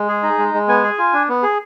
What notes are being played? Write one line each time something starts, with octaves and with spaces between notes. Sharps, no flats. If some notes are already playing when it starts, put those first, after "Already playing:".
Already playing: G#3
G#4
D#4
G#3
G#3
B3 G#5
G#4
F4
D4
B3
G#4